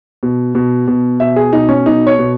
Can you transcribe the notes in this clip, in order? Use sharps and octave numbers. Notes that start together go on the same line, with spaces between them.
B2
B2
B2
B2 E5
G#4
B2 D#4
C#4
B2 D#4
C#5
B2